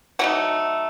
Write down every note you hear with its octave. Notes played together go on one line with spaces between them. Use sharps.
F#3 A3 D#4 F#5